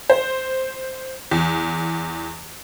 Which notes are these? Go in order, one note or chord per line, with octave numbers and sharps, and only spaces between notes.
C5
E2